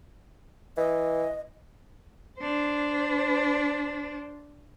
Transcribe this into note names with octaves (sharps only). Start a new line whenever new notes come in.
E3 D#5
D4 C5